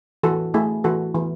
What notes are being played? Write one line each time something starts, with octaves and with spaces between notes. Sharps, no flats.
E3 F#4 A4
A3 E4 G#4
E3 F#4 A4
E3